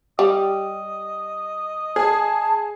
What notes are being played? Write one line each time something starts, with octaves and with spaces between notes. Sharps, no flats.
G3 D#5
G#4 A5